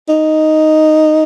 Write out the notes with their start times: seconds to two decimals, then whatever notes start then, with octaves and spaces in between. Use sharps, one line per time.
0.09 D#4